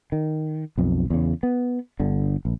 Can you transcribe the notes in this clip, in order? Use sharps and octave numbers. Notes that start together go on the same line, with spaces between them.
D#3
B1 F2
E2 C#3
B3
G1 D3
A#1